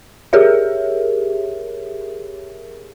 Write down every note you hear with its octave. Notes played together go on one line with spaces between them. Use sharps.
G4 G#4 A#4 C#5 E5